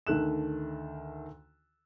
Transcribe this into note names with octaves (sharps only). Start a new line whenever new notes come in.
D2 D#3 A4 F#6 E7